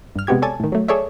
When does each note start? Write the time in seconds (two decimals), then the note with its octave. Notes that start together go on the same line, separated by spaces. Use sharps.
0.16 G2 F6
0.27 C3 G#3 B3 F#4 G4 G#6
0.42 A4 C#5 D5 G#5 A5
0.60 A2 D#3
0.72 F#3 A3
0.88 G#4 A4 C#5 D5 E5